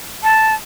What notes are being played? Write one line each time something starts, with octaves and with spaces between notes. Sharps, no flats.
A5